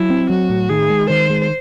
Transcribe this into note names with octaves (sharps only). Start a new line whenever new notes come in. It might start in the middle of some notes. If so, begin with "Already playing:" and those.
Already playing: F#3 E4
C4
F#3 F#4
A2
D#3 G#4
G#3
D#3 C5
G#3